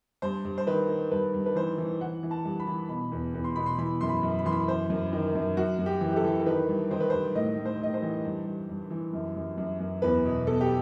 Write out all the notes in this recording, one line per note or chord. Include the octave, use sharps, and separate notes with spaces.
G2 C5
G2
C5
D#3 B4
D#3
G2 B4
G2
B4
E3 C5
E3
E3 F#5
E3
A5
G2
B5
E3
B2 B5
E2
E2
C6
B2 B5
C6
E3 B5
F#2 C6
B5
F#2
B5
E3 C6
B5
F#2 C5
F#2
D#3
F#2
F#2 F#4
F#2
G4
E3
G4
A4
E3
A4
D#3 B4
G2
D#3 C5
B4
G2 C5
A2 D#5
A2
C5
A2 D#5
C5
E3
G2
G2
G2
E3
F#2
F#2
F#2
F#2
E2 B4
B2
B2 A4
G4